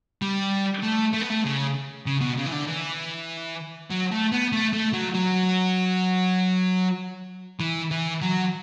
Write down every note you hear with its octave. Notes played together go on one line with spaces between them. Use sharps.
G3
A3
A3
B3
A3
C#3
C#3
B2
C#3
E3
D3
E3
F#3
A3
B3
A3
A3
F#3
F#3
E3
E3
F#3